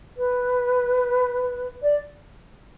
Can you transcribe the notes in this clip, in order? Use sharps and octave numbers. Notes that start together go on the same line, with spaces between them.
B4
D5